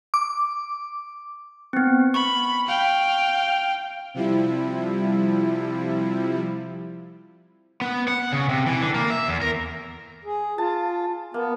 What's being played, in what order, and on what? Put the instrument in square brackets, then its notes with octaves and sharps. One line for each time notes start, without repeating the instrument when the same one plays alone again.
[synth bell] D6
[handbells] B3 C4
[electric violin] B5 [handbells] C#6
[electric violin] F5 G5
[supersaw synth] C3 F3 G3 E4
[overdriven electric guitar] B3
F#5
C#3
C3
E3
D3
A#3
E5
E2
A#4
[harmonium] G#4
[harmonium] F4 [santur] A5
[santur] A#3 [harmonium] B3